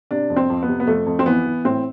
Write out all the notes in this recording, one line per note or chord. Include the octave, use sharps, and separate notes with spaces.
C3 D4
F2
C4
F2
B3
C3
B3
F2 A3
F2
C4
E3 B3
E3
A2 C4